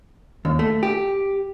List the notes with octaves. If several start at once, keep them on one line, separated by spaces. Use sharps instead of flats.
D#2
A3
G4